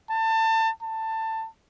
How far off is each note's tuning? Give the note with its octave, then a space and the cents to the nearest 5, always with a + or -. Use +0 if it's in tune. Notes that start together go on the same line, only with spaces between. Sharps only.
A5 +25
A5 +20